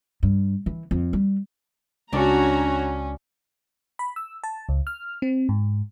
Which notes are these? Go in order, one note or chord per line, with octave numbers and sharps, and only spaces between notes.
G2
E3
F2
G3
C#2 C#4 D4 F#4 C#5 D5 A#5
B5
E6
A5
C#2
F6
C4
G#2